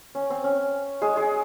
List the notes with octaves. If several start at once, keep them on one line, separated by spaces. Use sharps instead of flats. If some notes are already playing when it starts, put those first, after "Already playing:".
C#4
C4
C#4
G#3 G#4
G#3 G#4